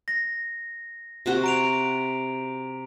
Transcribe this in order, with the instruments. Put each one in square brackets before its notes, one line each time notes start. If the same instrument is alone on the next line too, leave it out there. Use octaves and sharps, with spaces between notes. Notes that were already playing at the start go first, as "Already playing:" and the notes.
[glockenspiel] A#6
[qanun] C3 F#4 C5
[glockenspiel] A#5 D7 F7